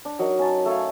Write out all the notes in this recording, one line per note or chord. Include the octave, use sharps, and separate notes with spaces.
D4
F#3 D#4 A#4
C#4 A5
A3 A4 C#5 F5